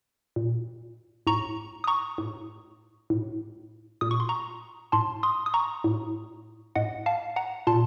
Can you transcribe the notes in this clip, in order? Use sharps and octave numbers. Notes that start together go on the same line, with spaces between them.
A#2
A2 A#5 C#6
D#6
A#5 C#6
A2
A2
A#2 D#6
C#6
C6
A#5 C#6
A2 A5 C6
C6 D#6
D#6
A#5 C#6
A2
A2 D#5 F#5
F5 A5
F#5 A#5
A#2 A5 C6